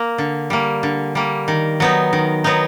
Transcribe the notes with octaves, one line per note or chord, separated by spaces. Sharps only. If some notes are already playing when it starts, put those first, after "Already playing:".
Already playing: A#3
D3
G3 A#3
D3
G3 A#3
D#3
F#3 B3 D#4
D#3
F#3 B3 D#4